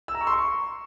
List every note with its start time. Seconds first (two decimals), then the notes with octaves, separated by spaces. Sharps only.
0.08 E6
0.14 A#5
0.21 C#6
0.27 C6
0.33 C#6